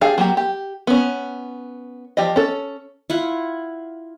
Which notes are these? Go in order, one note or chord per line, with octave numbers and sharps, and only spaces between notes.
D4 G4 G#4 D5 F5
F#3 A#3 G4
G4
B3 C#4
F3 G4 D5 D#5
C#4 A4
E4 F4 F#5